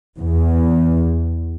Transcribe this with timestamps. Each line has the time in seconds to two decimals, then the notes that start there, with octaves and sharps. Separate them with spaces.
0.18 E2